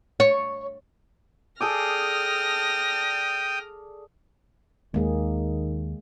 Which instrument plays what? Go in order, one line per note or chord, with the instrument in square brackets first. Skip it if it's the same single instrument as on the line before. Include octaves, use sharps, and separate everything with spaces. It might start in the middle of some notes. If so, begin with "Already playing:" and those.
[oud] C#5
[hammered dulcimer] G#4 A4 D5 [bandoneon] G5 D#6 [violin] F6 A#6
[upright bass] D#2 [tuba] D#3 [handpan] G#3 A#3 G#4